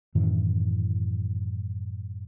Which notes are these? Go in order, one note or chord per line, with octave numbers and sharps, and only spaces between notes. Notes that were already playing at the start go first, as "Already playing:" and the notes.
F#2 A2 D#3 E3